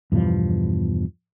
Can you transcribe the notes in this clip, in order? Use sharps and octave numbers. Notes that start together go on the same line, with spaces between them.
E2 G2 B2 F3